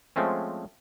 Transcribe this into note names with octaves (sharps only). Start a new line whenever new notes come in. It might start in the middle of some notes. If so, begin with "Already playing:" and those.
F3 G#3 A3 C4 C#4